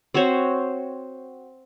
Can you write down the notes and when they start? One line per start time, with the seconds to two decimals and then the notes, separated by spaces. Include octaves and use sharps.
0.14 C4 F#4 C5 C#5